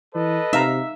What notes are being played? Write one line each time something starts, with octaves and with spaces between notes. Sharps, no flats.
E3 A4 B4 D#5
C3 D#4 E5 F5 A#5